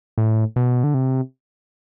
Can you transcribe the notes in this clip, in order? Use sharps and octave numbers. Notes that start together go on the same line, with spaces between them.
A2
B2
D3
C3